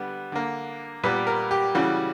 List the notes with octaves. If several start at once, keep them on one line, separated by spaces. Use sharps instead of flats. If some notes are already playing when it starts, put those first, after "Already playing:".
Already playing: D3 G3 B3
D3 A#3
A#2 G3 B3 B4
A#4
G4
C#3 E3 G3 F#4